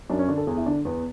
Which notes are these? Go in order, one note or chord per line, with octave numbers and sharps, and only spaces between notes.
F#2 D4
C#4
D3 D4
A4
E2 G#4
E4
D3 D4
E2 B3